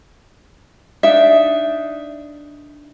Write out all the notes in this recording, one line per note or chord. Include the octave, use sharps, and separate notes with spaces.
D4 D#4 D5 E5